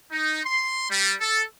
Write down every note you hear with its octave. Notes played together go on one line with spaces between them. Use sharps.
D#4
C6
G3
A4